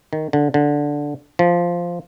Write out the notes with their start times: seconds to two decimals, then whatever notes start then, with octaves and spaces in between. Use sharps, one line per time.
0.13 D#3
0.33 D3
0.54 D3
1.39 F3